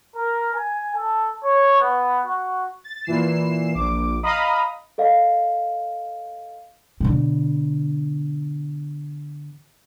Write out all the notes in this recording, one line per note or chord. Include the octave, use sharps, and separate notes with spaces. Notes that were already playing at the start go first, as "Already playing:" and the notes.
A#4
G#5
A4
C#5
B3
F#4
A6
A#2 E3 C7 E7
A#1 D6
D#5 F5 A#5 B5 D#6
A4 D#5 F5
B2 D3